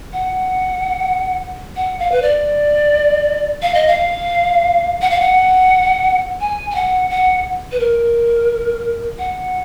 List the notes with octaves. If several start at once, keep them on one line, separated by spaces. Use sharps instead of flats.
F#5
F#5
F5
B4
D5
F5
D#5
F5
F#5
F5
F#5
G#5
G#5
F#5
F#5
B4
A#4
F#5